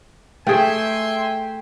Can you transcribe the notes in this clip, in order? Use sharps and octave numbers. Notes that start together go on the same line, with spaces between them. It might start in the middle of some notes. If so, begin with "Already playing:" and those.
A3 G#4 E5 G5 G#5 C6